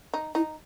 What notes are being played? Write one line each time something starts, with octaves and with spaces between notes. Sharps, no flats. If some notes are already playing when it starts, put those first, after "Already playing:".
D#4
D#4 E4